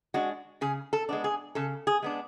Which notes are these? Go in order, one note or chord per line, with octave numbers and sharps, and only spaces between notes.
G#3 D4 F#4
C#3 G#4
A4
G#3 B3 D4
G#4
C#3 A4
G#4
G#3 B3 D4